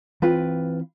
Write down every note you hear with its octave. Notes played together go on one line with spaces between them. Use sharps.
E3 C4 F4 B4 G5